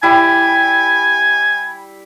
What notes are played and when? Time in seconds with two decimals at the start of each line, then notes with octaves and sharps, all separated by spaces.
0.03 G3 E4 G#5